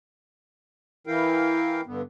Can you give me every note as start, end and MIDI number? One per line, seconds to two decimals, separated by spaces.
1.07 1.81 52
1.07 1.81 64
1.07 1.81 70
1.07 1.81 77
1.07 1.81 79
1.86 2.02 43
1.86 2.02 50
1.86 2.02 59